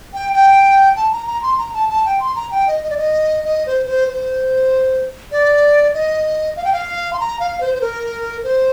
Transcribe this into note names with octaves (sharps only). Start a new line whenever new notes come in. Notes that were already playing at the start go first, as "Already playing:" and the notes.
G5
G5
A5
A#5
A#5
C6
A#5
A5
A5
G5
C6
A#5
G5
D#5
D#5
D5
D#5
D#5
C5
C5
C5
D5
D#5
F5
G5
F5
C6
A#5
F5
C5
C5
A#4
C5